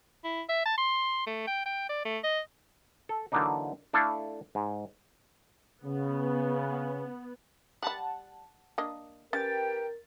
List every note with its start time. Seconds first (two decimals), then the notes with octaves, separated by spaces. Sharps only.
0.24 E4
0.49 E5
0.66 A5
0.78 C6
1.27 A3
1.47 G5
1.66 G5
1.89 D5
2.05 A3
2.24 D#5
3.09 A4
3.32 D3 E3 F#3 A#3 D4 D#4
3.93 A3 D4 E4 A4 E5 F5
4.55 G#2
5.84 C#3 B3
7.83 G3 F#5 A5 B5
8.78 A#3 D4 D#5
9.33 C#4 G4 A#4 B4 G5 A6